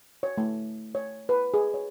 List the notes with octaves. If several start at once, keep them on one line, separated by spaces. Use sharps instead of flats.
C#5
A3
C#5
B4
G#4
C#5